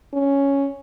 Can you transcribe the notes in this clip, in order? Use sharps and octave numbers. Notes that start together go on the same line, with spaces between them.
C#4